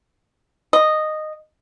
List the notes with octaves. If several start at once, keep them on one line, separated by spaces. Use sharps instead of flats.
D#5